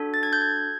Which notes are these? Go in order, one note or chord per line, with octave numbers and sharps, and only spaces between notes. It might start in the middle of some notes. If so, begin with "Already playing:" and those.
Already playing: D4 F#4 A4
A6
G#6
G6
G#6